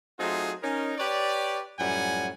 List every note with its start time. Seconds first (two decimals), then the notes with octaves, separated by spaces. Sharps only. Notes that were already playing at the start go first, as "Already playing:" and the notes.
0.19 F#3 A3 C4 D#4 F4 G#4
0.63 C#4 D#4 A#4
0.98 G4 B4 C#5 D5
1.79 F#2 A2 F3 G3 F#5 G#5